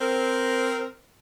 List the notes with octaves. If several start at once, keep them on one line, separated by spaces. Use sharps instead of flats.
C4 A#4